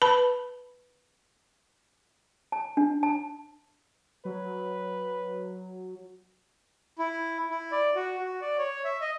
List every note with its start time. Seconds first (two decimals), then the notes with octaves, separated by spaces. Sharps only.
0.02 B4 A5 B5
2.52 A5
2.77 D4
3.03 A5
4.25 F#3 B4
6.98 E4
7.50 E4
7.72 D5
7.95 F#4
8.18 F#4
8.41 D5
8.58 C#5
8.84 E5
9.01 D#5